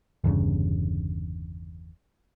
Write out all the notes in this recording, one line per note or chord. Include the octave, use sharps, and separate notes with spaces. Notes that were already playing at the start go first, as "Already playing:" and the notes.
G1 E2 G2 C#3